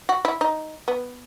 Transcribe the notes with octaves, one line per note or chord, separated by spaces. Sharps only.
F#4
E4
D#4
B3